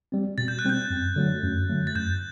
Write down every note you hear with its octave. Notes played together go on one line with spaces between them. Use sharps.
G3 C4
B2 A6
G6
F#6
G3 C4 G6
F#2
D3 F#3 A3
F#2
D3 F#3 A3
A6
F#2 G6